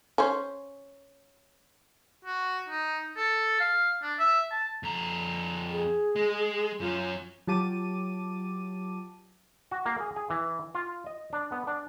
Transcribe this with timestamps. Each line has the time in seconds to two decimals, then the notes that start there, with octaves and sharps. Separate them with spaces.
0.18 C#4 C5
2.25 F#4
2.69 D#4
3.17 A4
3.60 F5
4.03 D4
4.19 E5
4.51 A5
4.83 F2 A#5
5.70 G#4
6.16 G#3
6.80 F#2 C#4 F4
7.47 F#3 F4 G4 A5 D6 D#7
9.71 F#4
9.86 A#3
10.00 G#4
10.16 G#4
10.30 E3
10.75 F4
11.06 D#5
11.33 D4
11.52 B3
11.67 D4